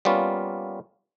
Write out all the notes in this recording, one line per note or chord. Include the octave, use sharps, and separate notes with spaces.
G3 A#3 B3 C#4 F4